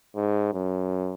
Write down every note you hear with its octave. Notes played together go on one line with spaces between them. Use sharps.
G#2
F#2